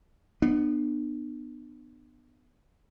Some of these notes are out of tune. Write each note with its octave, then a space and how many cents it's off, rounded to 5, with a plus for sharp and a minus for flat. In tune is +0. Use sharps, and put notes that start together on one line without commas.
B3 +0 D4 +40